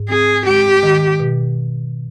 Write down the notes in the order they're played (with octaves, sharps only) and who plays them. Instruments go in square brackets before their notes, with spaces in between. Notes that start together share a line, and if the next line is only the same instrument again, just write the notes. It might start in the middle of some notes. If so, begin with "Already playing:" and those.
Already playing: [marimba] G#2
[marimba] C4 [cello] G#4
[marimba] G#3 [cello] G4
[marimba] D#3
B2